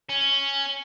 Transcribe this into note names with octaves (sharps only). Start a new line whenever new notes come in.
C#4